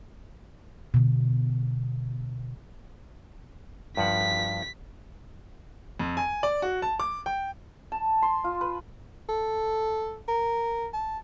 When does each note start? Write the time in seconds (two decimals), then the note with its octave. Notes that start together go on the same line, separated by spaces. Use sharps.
0.94 B2 D3
3.97 G2 F3 F#5 B6
6.00 F2
6.17 G#5
6.43 D5
6.62 F#4
6.82 A5
7.00 D6
7.26 G5
7.92 A5
8.22 C6
8.44 F4
8.61 B4
9.29 A4
10.28 A#4
10.93 A5